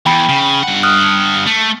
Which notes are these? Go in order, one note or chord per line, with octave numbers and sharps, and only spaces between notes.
E2 G5 B5
C#3
G2 F#5
D#6 F6 F#6
A3